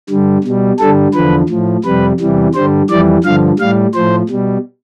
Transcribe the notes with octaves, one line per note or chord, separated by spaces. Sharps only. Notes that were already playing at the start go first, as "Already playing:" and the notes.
G2 D3 G3
B2 G3
G2 D3 G3 A4
E2 D3 F3 B4
A2 F3
F2 C3 G3 B4
E2 C3 E3 G3
G2 D3 G3 C5
F2 E3 G3 D5
G2 D3 F3 F5
A2 G3 F5
A2 F3 C5
B2 G3